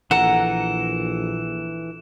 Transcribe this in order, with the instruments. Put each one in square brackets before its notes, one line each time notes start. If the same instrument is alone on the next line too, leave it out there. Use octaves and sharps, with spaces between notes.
[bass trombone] A#1 [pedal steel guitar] E3 A4 A#5 [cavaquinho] F#5 [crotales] E7